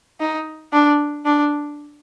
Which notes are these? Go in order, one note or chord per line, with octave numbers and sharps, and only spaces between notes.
D#4
D4
D4